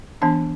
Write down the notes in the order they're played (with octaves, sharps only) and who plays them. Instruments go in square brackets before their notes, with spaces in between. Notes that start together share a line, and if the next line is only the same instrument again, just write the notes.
[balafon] E3 B3 D4 A5